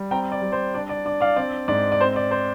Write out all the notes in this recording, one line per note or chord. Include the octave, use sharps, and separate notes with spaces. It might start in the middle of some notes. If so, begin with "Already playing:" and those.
Already playing: G3
C4 G5 A#5
D5
G3
C5
D4 D5
D5
D4 D5
D5 F5
C4 D5
G#2 D5
D5
C4 C5
D5
C5